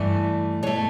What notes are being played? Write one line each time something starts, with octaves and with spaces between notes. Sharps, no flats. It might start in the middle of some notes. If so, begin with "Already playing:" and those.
Already playing: G2 E3 A3
B2 A3 C#5